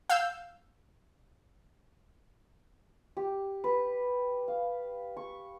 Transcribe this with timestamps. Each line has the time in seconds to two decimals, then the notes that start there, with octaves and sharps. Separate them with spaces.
0.10 F5 E6 G6
3.17 G4
3.64 B4
4.48 F5
5.17 C#6